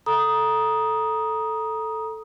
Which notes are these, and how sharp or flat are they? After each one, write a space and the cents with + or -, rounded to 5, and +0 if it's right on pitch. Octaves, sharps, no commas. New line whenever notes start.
A4 +0 A#5 +25 D#6 +0